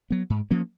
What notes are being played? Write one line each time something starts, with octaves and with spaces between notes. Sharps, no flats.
F#3 B3
G#2
F3 A#3 C#4